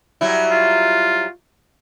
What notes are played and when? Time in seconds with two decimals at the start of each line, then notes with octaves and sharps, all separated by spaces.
0.21 F#3 G3 E4
0.51 F4